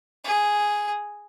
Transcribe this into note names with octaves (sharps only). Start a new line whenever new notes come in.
G#4